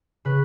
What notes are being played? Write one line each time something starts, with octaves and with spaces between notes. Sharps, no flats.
C#3 B4